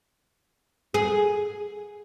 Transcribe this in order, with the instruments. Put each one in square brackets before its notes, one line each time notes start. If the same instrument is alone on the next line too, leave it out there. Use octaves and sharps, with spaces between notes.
[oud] G#4